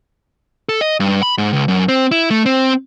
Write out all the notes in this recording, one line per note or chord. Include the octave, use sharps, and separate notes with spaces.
A4
D#5
G2
B5
G#2
C#2
F#2
C4
E4
A3
C4